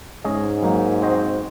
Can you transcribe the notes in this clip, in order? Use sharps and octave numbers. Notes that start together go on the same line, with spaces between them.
G#2 G#3 C#4 G#4 D#5
F#3 A#3 D#4
C4 F#4 C5 D#5